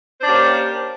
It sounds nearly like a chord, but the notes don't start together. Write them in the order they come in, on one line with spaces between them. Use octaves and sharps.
C5 D4 C#4 G4 A#3